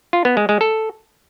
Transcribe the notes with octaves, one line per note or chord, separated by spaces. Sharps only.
F4
B3
G#3
G#3
A4